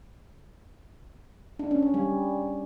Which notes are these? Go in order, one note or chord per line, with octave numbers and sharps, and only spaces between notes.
D4
C#4
C#4
G3